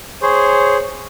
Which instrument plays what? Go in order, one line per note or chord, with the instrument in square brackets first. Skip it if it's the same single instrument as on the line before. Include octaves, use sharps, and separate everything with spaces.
[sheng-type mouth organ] G#4 C5 [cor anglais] C#5